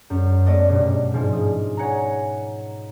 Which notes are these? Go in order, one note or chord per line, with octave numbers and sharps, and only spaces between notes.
F#2
A3 B3 D5 D#5
G2 B2
G#2 F3
D#6
C#5 F#5 G#5 A#5